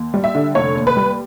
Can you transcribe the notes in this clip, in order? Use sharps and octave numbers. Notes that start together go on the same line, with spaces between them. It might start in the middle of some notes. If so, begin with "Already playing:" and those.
Already playing: D#2
G3
E5
D3
F1 C#5
D#2
B4
G3